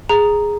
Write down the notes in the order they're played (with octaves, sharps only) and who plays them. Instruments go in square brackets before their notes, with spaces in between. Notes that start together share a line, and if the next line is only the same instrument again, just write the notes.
[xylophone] G#4 A#5